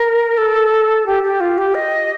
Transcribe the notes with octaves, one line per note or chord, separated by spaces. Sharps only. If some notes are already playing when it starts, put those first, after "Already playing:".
Already playing: A#4
A4
G4
G4
F4
G4
D#5